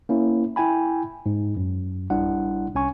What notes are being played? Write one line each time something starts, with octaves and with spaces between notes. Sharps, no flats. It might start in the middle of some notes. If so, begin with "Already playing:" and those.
A#3 C#4 E4
E4 G5 G#5 B5
G#2
F#2
A1 G3 D4 E4 F#5
C2 C#4 G#5 C#6